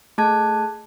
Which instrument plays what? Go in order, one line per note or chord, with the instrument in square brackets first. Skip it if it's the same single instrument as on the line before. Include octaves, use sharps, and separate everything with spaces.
[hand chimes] A3 G#4 A5 F#6 G#6